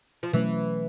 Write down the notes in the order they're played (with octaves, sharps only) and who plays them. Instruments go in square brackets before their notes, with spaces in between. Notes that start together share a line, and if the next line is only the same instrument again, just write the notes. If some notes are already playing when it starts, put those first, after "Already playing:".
[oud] F3
[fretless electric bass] B2 F#3 A3 C#4 [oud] E3